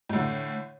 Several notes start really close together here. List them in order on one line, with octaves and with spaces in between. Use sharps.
A2 D3 E3